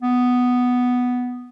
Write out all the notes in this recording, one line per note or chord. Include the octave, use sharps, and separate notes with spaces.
B3